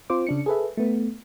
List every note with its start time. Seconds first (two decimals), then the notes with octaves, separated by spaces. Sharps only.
0.10 C4 F4 C5 D6
0.27 C#3 D4 C#7
0.46 G#4 A4 B4 E5
0.77 A3 B3